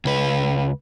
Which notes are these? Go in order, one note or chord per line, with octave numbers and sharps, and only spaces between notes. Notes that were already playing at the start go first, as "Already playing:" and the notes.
C#2 B4